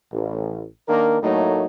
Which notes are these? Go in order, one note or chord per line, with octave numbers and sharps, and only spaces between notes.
A1
D#3 A#3 D4 A#4
A2 F#3 A3 A#3 D#4